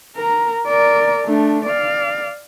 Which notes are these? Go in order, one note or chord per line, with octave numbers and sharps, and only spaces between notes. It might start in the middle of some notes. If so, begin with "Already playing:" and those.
A#4 A#5
A#4 D5
A3 D4
D5 F5